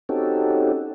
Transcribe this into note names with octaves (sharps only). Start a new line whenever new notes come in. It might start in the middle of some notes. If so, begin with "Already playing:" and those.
C4 C#4 D#4 F#4 G4 A4